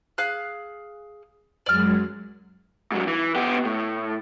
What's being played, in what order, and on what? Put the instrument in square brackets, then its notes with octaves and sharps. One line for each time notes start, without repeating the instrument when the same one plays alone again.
[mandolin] G#4 F5 F#6
[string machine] F#2 F#3 G#3 [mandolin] D5 F6
[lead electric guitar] G#2 F#3
E3
B3 G4
A2